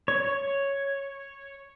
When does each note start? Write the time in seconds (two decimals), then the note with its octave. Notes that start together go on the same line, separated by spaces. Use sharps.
0.08 C#5
0.25 C#5